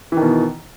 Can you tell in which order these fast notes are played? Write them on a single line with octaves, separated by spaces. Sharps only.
E3 D#3 B2